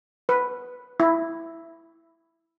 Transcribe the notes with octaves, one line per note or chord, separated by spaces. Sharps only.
B4
E4